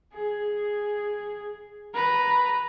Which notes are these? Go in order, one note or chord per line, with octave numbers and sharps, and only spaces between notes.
G#4
B4 A#5